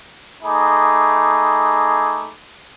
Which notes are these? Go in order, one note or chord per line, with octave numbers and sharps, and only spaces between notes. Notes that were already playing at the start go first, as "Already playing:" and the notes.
A3 D#4 G#4 B5 D6